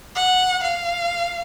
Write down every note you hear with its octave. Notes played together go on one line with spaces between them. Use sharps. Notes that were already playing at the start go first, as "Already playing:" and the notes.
F#5
F5